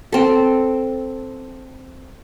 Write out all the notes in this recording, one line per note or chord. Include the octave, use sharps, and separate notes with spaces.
C4 A4